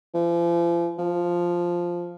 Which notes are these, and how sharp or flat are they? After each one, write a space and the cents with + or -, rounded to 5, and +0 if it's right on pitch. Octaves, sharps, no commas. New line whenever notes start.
F3 -40
F3 +0